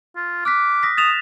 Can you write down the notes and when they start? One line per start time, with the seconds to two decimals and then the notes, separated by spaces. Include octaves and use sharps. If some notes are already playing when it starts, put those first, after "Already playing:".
0.16 F4
0.45 D6 F6 F#6 B6
0.83 D#6 A#6 B6
0.97 D#6 A6 E7 F7